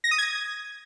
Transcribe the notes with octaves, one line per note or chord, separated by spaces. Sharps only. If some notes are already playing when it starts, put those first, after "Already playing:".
A#6
D#6
G#6